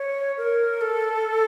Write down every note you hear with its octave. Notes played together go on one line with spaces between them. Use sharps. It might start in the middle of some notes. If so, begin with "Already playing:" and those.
Already playing: C#5
A#4
A4